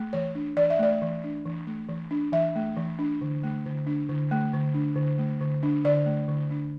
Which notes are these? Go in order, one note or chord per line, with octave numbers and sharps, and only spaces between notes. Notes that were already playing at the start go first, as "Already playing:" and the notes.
Already playing: A3
E3 C#5
D4
E3 D5
E5
A3 D5
E3
D4
E3
A3
E3
D4
E3 E5
A3
E3
D4
D3
A3
D3
D4
D3
A3
D3
D4
D3
A3
D3
D4
D3 D5
A3
D3
D4